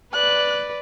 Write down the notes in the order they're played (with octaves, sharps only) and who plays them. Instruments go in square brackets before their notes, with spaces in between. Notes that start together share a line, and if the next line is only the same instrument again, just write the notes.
[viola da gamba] B4 D5 [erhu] F#6